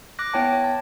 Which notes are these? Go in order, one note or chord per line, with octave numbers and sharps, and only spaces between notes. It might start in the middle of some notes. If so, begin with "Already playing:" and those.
D6 F#6 A#6
B3 E4 C#5 G5 A5
C#5
A5